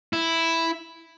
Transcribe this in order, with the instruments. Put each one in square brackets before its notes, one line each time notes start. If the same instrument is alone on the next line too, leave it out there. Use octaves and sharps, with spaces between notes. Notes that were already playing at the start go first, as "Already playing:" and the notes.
[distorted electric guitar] E4